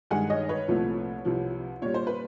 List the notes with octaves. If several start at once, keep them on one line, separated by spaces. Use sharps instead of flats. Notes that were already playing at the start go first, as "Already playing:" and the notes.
G2 D#3 G#3 F#5 G#5
C#5 D#5
B4 C#5
C2 A#2 F3 A3
C2 C3 F3
A#2 G3 C#5
C5
B4